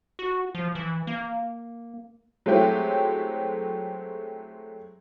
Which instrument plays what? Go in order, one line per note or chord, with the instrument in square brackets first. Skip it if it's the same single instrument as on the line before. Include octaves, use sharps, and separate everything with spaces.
[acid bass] F#4
F3
E3
A#3
[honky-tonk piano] F#3 G#3 A3 C4 E4 G4